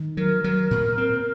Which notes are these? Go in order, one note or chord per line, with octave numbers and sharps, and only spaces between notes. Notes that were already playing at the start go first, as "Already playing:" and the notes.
Already playing: D#3
F#3 A#4
F#3 A#4
A#2
C4